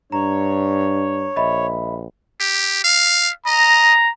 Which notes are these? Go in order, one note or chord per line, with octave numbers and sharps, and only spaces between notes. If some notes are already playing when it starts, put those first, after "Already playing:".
G2 D4 C#5 A#5
A#1 D#5 E5 B5
G4
F5
D#5 A#5